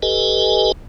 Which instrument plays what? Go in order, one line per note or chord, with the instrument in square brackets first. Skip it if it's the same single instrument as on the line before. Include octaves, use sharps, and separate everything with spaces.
[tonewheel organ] G4 A4 B4 D#5 G#5